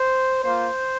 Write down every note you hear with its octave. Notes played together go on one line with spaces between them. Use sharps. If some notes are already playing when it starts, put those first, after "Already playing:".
Already playing: C5
A#3 F4 C5